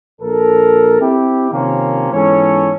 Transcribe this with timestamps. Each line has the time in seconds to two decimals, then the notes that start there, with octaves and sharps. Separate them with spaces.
0.21 A#1 A4 A#4
1.01 C4 E4 G4
1.52 C3 D#3 F3 A#3 C4 C#4
2.12 G#2 E3 B3 C#4 A4 C#5